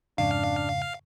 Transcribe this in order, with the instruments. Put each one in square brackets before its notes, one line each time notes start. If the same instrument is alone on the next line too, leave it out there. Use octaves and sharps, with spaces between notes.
[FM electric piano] F2 G#2 C#3 [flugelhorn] D4 [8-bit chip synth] F5